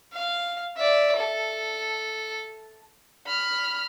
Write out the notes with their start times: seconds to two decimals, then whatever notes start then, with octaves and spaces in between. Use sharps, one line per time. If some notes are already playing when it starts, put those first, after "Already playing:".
0.13 F5
0.77 D5 E5
1.16 A4
3.26 B5 F6